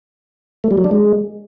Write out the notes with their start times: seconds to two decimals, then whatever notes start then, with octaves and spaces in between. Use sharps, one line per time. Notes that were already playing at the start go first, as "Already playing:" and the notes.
0.64 A3
0.71 G3
0.78 F#3
0.84 D4
0.91 G#3